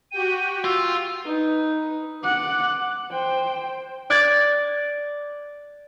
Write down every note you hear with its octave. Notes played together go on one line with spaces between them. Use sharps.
F#4 G4 G5 D#7
F4 E6
D#4 B4
F#5 D6
C5 G5
D5 F#6 G#6 A6